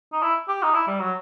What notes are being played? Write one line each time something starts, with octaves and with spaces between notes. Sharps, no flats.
D#4
E4
G4
D#4
E4
G3
F#3